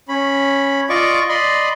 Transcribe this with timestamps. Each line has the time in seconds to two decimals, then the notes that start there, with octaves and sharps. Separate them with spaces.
0.08 C#4 B5
0.89 F4 D5 D#5 C#6 D6
1.29 D5 D#5 B5 C6